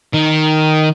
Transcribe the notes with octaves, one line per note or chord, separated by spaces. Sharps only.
D#3